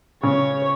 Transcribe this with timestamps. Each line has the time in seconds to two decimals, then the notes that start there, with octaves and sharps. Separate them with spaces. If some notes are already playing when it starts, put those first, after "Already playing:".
0.23 C#3 C#5